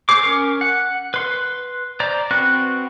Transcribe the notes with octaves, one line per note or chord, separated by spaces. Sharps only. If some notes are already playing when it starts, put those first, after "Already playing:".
G#4 C5 D6
C#4 A#4
F#5
B4 C6
C5 D5 A#5
C4 F#4 B4 F#6